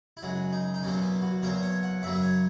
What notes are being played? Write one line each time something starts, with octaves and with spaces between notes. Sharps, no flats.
E4
F#2 C#3 G#3 F#4
D#4
D#4
E2 B2 F#3 A#3 C#4
B3
F#4
E2 B2 F#3 A#3 A#4
C#5
F#5
F#2 C#3 F#3 A#3 E5
C#5